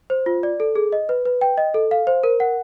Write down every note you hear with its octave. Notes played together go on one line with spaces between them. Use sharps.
C5
F4
D5
A4
G#4
D#5
B4
B4
G5
D#5
A4
F5
C5
A#4
F#5